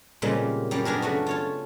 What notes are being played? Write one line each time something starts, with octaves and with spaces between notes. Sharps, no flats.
A#2 C#3 G3 G#3 A#3 C4
F#2 G3 G4
B3 D4 G#4 A#4
C#3 A3 D4 F#4
F4 C#5 A5